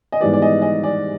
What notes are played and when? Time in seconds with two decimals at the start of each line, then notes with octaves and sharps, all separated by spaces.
0.12 D#5
0.20 G#2 E3 G3 B3 D5
0.33 D5
0.42 D#5
0.62 D#5
0.83 D5